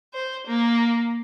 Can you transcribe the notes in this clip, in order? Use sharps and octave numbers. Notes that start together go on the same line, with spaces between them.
C5
A#3